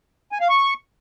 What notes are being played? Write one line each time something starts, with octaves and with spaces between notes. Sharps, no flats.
G#5
F5
C#6